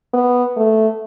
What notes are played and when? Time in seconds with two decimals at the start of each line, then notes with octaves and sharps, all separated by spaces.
0.13 B3
0.57 A3